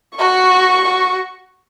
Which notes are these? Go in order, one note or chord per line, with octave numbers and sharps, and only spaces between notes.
F#4 C#6
F#4